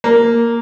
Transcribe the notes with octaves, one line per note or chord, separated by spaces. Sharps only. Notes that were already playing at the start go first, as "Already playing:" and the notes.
A#3